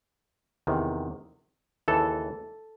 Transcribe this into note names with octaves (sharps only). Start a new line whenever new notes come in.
E2 C3 D#3
D#2 C#3 E3 A4